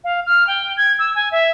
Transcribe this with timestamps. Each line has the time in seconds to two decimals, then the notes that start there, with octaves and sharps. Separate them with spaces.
0.04 F5
0.25 F6
0.47 G5
0.77 G#6
0.99 E6
1.14 G#5
1.31 E5